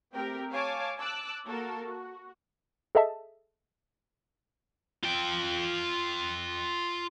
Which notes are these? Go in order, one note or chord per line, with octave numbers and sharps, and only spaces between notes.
A3 C4 G4 A#4 G5
C#5 F5 G#5 A5 D6
A5 D6 E6 F#6
A#3 F#4 A4 A#4
F#4
G#4 A4 D#5 E5 A5
F4 G5